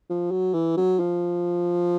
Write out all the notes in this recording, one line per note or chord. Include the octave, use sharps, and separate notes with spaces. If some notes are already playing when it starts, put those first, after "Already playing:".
F3
F#3
E3
F#3
F3